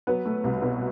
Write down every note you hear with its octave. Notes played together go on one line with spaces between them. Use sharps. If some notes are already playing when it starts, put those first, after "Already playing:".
F#3 B3 B4
A3
C2
B2